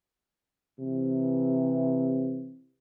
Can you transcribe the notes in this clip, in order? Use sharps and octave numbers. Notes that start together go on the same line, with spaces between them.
C3 E3